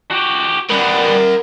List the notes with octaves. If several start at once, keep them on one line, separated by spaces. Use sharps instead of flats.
F#4 G4
G3 B3 A#4 F#5